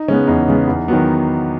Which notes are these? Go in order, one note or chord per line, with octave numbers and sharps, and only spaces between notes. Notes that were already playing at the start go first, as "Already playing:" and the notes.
Already playing: D#4
C#3 G#3 B3 C#4
E2 D#4
C#3 G#3 B3
E2
D#3 F#3 B3